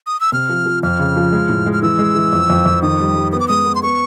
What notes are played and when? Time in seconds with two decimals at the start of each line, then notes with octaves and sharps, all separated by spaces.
0.07 D#6
0.20 E6
0.32 C3 F6
0.49 F3
0.66 F3
0.83 F2 F6
0.99 C#3
1.16 F3
1.32 G#3
1.49 A2
1.66 G#3
1.73 F6
1.83 E3 E6
1.99 G#3
2.15 E3
2.33 F2
2.50 F2
2.66 F2
2.82 D#3 D#6
3.00 G3
3.15 G3
3.32 B3 D#6
3.40 D6
3.48 G#3 D#6
3.66 B3
3.75 C6
3.83 B3 C#6